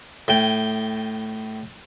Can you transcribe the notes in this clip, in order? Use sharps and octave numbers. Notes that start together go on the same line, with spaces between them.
A2 G5